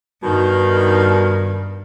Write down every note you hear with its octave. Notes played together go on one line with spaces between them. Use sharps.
G2 B2 D#3